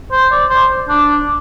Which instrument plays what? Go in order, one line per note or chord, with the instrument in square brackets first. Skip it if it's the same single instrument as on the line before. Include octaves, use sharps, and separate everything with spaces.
[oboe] C5
D5
C5
D4